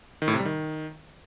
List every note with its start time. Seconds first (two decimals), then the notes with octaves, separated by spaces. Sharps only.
0.22 D#3
0.28 A2
0.34 C3
0.40 G3
0.46 D#3